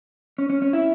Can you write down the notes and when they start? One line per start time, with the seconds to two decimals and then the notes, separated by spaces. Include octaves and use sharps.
0.38 C#4
0.50 C#4
0.62 C#4
0.73 E4